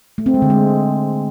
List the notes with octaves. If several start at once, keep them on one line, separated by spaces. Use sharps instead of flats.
A3
C4
G#3
D3
G#3